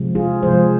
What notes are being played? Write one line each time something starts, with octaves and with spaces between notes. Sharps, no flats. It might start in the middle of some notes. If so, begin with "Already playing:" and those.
Already playing: C3 F3 G#3
F4 G#4
C3 F3 G#3 G#4 C5